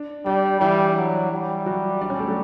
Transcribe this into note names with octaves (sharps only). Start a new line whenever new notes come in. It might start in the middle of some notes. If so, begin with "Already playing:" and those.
Already playing: D4
G3 D4
E3 G3 E4
F#3
G3
F#3 F#4
D4 D5
C#4 C#5
A3 A4
F#3 F#4